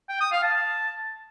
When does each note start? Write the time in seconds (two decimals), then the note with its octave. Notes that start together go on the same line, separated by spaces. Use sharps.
0.09 G5
0.21 D#6
0.32 F5
0.43 A5